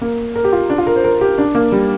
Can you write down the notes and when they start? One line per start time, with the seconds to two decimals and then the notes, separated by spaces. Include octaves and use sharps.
0.01 A#3
0.35 A#4
0.44 G4
0.52 F4
0.70 D4
0.78 F4
0.87 A#4
0.96 C5
1.04 A#4
1.21 G4
1.38 D4
1.55 A#3
1.72 G3